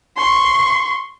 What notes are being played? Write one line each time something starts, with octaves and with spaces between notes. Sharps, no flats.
C6 C#6